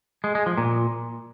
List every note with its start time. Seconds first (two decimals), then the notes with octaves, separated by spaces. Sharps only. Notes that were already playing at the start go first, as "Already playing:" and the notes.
0.24 G#3
0.35 G#3
0.46 F3
0.58 A#2